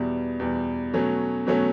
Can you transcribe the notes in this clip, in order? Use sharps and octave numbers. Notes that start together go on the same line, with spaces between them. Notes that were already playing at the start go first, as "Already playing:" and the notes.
Already playing: E2 B2 G3
E2 B2 G3
B2 F#3 A3 C#4
B2 F#3 A3 C#4